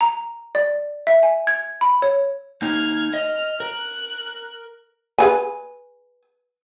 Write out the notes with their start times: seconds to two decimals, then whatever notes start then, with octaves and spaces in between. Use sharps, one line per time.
0.01 A#5
0.55 D5
1.07 E5
1.23 G#5
1.47 G#6
1.81 B5
2.02 C#5
2.62 A#3 D#4 F6 G#6
3.14 D#5 F6
3.60 A#4 F#6
5.18 G#4 B4 G#5